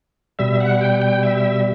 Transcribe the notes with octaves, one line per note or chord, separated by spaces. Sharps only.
B2 G3 E5
F#5
G5
G5
E5